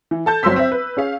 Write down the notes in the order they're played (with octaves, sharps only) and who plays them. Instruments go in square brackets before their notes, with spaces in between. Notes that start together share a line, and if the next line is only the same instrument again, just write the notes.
[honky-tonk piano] E3
A4 A5 G6
G1 F#3 C4 C6 E6 B6
C4 E5
B4
C#4 G#4 F5